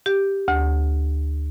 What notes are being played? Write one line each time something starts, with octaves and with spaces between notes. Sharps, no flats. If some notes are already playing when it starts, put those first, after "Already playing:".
G4
D2